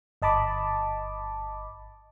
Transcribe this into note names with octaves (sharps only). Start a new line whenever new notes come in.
G1 D#5 A5 B5 D6